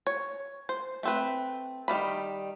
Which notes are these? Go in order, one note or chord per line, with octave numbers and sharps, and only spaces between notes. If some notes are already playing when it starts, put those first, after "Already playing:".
C#5
C5
A3 C4 B4
D#3 G3 A#3 B5